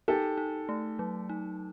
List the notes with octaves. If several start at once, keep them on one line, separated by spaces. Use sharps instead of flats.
D#4 G4 A4
D#4
A3
F#3
D#4